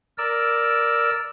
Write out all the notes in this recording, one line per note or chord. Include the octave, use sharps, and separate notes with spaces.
A#4 D5 E6